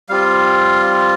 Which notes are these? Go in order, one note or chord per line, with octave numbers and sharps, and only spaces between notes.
G3 C4 F4 F5